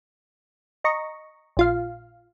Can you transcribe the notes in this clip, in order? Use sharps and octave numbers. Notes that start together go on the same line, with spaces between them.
D#5 A#5 C#6
A#1 F4 F5